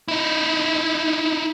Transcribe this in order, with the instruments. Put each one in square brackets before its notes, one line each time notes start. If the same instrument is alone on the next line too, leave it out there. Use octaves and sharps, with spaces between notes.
[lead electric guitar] D#4 E4